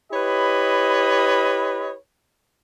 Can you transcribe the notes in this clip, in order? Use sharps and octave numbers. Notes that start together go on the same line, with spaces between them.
E4 G4 B4 C#5 D#5 B5